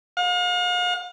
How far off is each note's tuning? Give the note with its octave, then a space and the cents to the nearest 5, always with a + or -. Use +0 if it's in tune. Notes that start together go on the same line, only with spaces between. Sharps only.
F5 +40